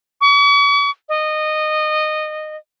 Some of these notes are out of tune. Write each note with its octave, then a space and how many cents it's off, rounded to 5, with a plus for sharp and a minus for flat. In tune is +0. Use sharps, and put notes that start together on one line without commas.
C#6 +45
D#5 -20